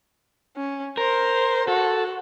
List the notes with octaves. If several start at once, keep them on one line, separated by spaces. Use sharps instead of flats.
C#4
A#4 C5
F#4 A4